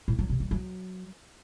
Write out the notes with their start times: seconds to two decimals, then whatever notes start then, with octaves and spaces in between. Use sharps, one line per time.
0.08 A2
0.19 F#3
0.29 C3
0.40 F#3
0.51 F#3